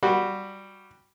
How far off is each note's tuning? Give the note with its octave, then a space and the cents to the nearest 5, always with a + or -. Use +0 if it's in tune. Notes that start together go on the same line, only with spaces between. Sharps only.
G3 +0 F#4 -10